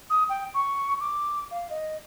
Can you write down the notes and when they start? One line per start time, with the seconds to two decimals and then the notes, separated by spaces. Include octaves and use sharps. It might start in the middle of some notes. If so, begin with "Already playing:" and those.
0.10 D#6
0.29 G5
0.54 C#6
1.00 D6
1.51 F5
1.70 D#5